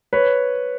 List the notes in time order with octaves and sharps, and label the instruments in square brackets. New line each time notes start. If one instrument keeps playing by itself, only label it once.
[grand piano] B4 C#5